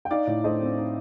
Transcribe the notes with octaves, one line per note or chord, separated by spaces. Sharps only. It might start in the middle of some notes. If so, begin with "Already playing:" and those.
G5
D#4 D5 F5
A2
A3 C5 D#5
C4
D#4